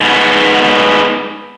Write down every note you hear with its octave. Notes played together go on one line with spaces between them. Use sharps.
G#2 B3